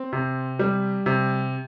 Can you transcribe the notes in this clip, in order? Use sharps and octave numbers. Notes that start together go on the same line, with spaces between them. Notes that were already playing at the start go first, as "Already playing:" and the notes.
Already playing: C4
C3
G3
C3